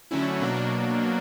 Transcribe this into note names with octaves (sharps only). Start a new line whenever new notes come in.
D3 F#3 A3 C#4 E4
B2 F#3 A#3 D4